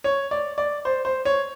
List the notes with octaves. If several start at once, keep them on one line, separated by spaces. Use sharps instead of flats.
C#5
D5
D5
C5
C5
C#5